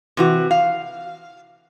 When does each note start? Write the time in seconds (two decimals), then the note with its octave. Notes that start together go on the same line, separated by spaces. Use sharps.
0.17 C3 E3 F#4
0.51 F5